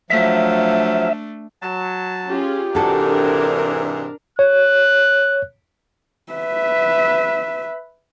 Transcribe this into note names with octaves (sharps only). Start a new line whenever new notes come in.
F3 F#3 A3 D4 E5 F5
F#3 A5
C#4 F4 G4 G#4
G#2 C3 E3 D4 F#4 A4 A#4
C#5 F#6
B4 E5